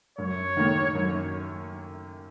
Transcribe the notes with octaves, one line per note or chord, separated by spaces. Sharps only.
F#2 C#5
D#3 A#3
F#2